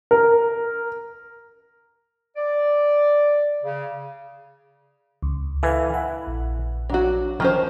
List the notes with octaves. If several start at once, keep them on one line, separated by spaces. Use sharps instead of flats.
A#4
D5
C#3
C#2
E3 A4 B4 F5
E4 F#5
A#1
F#3 D4 F#4 A#5
D#3 F3 C#4 A#4 C5